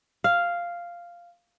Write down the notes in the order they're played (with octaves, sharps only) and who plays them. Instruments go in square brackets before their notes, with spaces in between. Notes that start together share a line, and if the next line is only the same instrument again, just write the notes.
[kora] F5